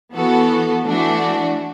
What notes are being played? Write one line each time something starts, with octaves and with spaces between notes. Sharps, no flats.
E3 B3 F#4 A4
E3 A3 D4 F#4